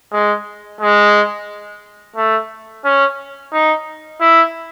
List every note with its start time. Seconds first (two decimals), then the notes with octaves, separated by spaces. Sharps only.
0.12 G#3
0.81 G#3
2.16 A3
2.85 C#4
3.53 D#4
4.21 E4